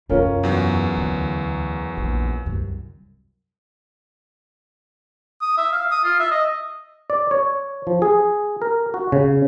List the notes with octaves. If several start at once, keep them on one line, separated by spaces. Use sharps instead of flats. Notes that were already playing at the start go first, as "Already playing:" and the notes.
F#2 C3 C#4 F4 A#4
E2 F#3
D2
A#1
C2 F#2
D#6
E5
F5
D#6
F4
E5
D#5
D5
C#5
F3
G#4
A#4
F#4
C#3